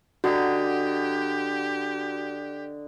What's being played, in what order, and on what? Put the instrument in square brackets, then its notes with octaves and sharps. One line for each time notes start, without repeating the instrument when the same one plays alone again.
[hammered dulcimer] D3 D#5 A#5 [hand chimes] F#4 [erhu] G4